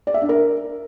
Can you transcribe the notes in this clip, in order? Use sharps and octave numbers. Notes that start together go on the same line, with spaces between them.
D5
E5
D4
A#4